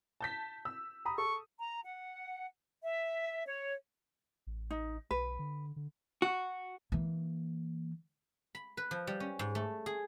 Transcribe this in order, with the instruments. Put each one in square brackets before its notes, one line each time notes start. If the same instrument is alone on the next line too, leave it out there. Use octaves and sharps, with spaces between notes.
[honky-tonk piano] A5 G6 B6
E6
[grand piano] A#5 B5 D#6
[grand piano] A4 [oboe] C#6
[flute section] A#5
F#5
E5
C#5
[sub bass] A1
[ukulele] D#4
[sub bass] B1 [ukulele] B4
[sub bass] D3
D3
[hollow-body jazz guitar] F#4
[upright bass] E3 A#3
[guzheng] B5
B4
F3
G3
C#4
G#2
A3
G#4